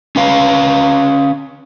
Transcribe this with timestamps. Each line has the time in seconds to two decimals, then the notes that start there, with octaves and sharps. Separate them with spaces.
0.16 C#4 B4 F5